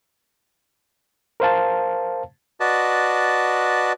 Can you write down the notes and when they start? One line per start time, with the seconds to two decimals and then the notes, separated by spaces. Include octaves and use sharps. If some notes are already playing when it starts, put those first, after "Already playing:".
1.40 A#4 C5 F5 A5
2.60 F#4 B4 D5 D#5 A5